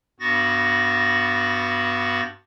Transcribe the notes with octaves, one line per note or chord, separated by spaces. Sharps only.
G2 B3 F#4 A6 A#6